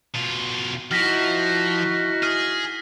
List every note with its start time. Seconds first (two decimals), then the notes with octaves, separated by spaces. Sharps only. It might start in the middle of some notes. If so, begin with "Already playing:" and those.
0.14 B2 F4
0.91 F3 D#4 E4 F#4 F6 A#6 B6
2.23 G#4 F6